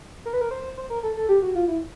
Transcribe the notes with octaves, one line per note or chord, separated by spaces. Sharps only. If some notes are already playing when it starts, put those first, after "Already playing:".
A#4
B4
A#4
C5
C5
A#4
A4
A4
G4
F#4
F4
E4